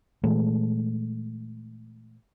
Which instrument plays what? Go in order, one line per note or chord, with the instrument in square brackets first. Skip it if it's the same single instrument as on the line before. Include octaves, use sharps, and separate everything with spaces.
[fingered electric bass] A#2 E3 G#3 A3